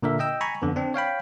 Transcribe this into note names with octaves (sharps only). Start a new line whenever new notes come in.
A#2 D3 A#4 E5
D#5 G5 E6
G#5 A#5 B5 C#6
F2 D3 B3
C4 D4
C#5 F5 G5 B5